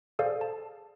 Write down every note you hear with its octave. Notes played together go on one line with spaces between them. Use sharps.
G#4 A4 C5 D5 F5
A5